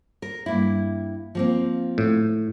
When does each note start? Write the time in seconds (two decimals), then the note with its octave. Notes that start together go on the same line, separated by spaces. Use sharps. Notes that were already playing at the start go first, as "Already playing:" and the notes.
0.22 A#4
0.46 G2 A#3 E4
1.35 F3 A#3 C4
1.98 A2